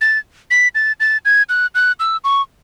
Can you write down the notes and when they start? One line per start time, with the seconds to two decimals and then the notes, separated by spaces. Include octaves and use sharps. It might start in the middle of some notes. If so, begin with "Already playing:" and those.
0.01 A6
0.51 B6
0.75 A6
1.00 A6
1.25 G#6
1.49 F#6
1.75 F#6
2.00 E6
2.24 C#6